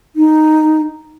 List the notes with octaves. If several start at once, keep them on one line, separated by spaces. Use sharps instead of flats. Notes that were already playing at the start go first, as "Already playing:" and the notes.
D#4